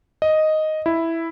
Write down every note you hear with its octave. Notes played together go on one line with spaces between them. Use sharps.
D#5
E4